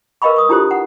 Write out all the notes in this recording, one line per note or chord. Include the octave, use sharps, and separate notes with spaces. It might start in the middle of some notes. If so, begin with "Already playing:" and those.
A#4 B4 D#5 F5 B5 C#6
C#6 D#6
D4 E4 F4 G4 A4 C5
F#5